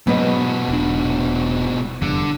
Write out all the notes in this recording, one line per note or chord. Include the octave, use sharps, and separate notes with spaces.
G#2 B2 F#3 B3 B4 D#5
E1 D4
F1 E2 G2 D3